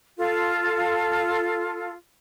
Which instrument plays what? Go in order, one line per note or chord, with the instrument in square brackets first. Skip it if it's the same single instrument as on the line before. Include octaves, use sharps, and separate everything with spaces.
[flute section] F4 A4